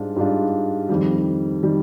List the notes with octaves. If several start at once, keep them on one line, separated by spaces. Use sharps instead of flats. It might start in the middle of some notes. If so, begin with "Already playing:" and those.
Already playing: G#2 G3 D4 F4
G#2 G3 D4 F4
F2 D#3 G3
D#3 G3